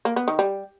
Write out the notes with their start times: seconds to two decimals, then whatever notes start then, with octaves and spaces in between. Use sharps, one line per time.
0.05 A#3
0.16 B3
0.28 D#3
0.39 G3